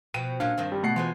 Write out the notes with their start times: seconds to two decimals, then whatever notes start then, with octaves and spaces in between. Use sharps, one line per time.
0.14 B2 F3 G5 D#7
0.40 A#2 F#3 C#4 D4 F5
0.57 G2 D#3 C4
0.72 G3
0.83 B2 A3 F#5 C7
0.96 E3 G#3 C4 F4